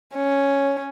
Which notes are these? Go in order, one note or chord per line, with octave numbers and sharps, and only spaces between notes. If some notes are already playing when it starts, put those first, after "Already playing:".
C#4